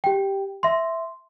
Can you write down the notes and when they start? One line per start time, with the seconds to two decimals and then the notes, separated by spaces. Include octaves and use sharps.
0.04 G4 G5
0.63 E5 C6